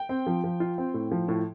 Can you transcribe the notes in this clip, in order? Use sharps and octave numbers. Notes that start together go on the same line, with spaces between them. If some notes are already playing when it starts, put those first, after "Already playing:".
Already playing: G5
C4
F3
F3
F4
C4
A2
F3
A2